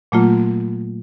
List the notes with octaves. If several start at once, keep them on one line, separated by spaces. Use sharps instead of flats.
A#2 F#3 A3 A#3 F4